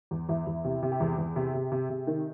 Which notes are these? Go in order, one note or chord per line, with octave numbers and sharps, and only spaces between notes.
E2
E2 E4
E2
C3
C3
G4
E2 G#4
E2
C3
C3
C3
C3
D#3